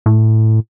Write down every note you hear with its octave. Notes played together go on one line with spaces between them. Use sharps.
A2